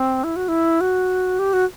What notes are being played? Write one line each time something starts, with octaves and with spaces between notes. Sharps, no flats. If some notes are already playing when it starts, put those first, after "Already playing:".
Already playing: C4
E4
F#4
E4
F#4
G4
F#4